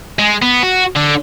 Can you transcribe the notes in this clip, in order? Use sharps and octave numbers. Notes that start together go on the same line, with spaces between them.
G#3
B3
F#4
D3